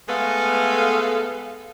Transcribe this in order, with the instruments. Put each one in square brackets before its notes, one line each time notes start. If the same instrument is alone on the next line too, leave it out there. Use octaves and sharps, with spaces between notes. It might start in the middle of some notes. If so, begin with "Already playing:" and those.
[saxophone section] G#3 A3 B3 A4 B4 F5